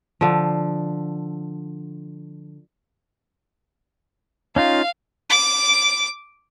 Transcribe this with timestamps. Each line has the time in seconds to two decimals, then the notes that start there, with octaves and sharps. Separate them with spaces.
0.21 D3 F3
4.56 C#4 D#4 F4 F5
5.30 D6